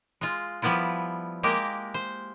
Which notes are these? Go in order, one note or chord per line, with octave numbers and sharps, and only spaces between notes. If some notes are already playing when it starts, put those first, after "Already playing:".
G#3 F4
F3 G3 B3 E4 F4
G#3 A#3 G4 A#4
C5